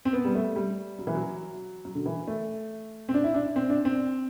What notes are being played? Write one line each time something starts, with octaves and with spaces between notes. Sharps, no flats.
C4
B3
G3
A3
G3
F#3
E3
F#3
F#3
D3
E3
A3
C4
D4
E4
D4
C4
D4
C4